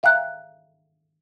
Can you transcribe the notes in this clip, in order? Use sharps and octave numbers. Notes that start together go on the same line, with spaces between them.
E5 F5 G5 A#5 F#6